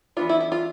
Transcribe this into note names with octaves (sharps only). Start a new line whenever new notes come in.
E3 B3 D4 F4
E4
E4
F4